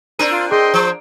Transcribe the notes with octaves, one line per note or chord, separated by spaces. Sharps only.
C4 D4 A#4 D#7
F4
G#4 D#5 G5 C6
F3 C5